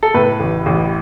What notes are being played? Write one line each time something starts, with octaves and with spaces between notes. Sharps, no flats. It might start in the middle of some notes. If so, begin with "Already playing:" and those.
A4
A2 B4
A1
A1